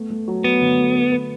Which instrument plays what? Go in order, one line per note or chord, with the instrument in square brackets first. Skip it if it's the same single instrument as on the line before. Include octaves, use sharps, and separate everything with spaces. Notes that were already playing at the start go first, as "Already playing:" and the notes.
Already playing: [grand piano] A3 B3
A3
F#3
[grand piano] F#3 [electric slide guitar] B3
[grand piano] D3
A3
B4
B4